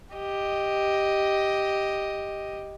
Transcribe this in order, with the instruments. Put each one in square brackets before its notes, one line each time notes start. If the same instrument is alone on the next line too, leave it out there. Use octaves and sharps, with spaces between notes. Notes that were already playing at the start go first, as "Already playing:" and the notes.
[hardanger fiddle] G4 D#5